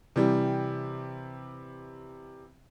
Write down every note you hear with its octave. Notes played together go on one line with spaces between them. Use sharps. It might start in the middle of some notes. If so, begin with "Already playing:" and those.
C3 E3 G3